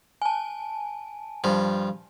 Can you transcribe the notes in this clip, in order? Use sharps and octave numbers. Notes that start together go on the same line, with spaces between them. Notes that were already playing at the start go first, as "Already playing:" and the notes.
G#5 A5
G2 F3